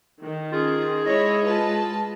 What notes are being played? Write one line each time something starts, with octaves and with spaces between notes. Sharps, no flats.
D#3
C#4 F4 G#4
G#3 E4 C#5 D#5
F4 B4 A5